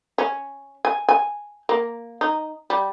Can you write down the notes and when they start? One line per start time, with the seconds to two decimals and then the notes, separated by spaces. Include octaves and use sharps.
0.18 C#4
0.85 G#5
1.09 G#5
1.69 A#3
2.21 D#4
2.70 G3